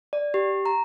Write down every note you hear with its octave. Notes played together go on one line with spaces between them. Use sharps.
D5
G4
A#5